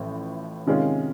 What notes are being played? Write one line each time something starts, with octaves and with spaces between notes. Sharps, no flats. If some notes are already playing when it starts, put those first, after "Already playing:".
Already playing: A1 A2 F3
C3 D#3 G#3 C#4 F4